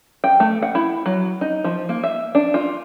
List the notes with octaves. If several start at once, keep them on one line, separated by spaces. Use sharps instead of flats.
G5
A3
F#5
E4
F#3
D#4
F3
A#3
E5
D4
F4